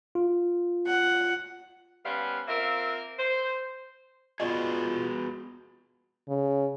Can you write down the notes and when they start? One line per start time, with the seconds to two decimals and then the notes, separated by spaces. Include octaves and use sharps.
0.15 F4
0.87 F#5
2.05 G3 B3 C#4 C5 F5 F#5
2.48 A#3 C4 F4 A#4 E5
3.19 C5
4.40 B3 F4 F#4 G#4 D5 D#5
6.28 C#3